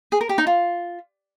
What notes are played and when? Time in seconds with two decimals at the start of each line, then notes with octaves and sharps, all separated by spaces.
0.12 G#4
0.21 A#4
0.29 G4
0.38 D#4
0.47 F4